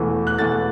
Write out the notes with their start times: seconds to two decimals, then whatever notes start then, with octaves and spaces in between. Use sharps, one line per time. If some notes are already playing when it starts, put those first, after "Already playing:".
Already playing: E1 E2 E3 A3
0.27 F#6
0.39 E1 E2 E3 A3 A6